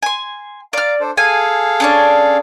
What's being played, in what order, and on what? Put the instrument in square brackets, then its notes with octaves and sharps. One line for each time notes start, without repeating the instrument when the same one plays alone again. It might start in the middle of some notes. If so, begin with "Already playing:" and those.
[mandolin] G#5 C6
[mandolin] D5 F6 [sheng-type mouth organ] F5 A#5
[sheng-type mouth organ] D4 A4 C5
[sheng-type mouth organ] G#4 A4 F5 [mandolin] G#5
[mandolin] C#4 D4 D5